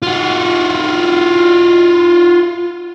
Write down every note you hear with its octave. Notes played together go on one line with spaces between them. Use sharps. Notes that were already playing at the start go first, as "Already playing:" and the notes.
F4 F#4